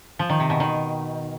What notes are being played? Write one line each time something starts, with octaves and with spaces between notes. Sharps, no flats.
F3
D#3
C3
B2
D#3